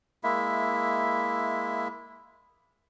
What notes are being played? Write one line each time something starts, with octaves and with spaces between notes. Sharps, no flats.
G#3 A#3 E4 E5